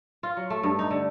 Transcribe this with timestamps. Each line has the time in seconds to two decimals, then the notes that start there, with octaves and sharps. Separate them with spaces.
0.23 F4
0.37 F#3
0.50 A3
0.63 G2
0.79 D#4
0.90 D3